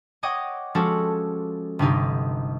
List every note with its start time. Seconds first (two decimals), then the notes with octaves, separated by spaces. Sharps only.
0.23 C#5 D#5 F#5 G5 D6 D#6
0.75 F3 G#3 C#4 F#4 G4 A4
1.79 G1 C3 D#4 G4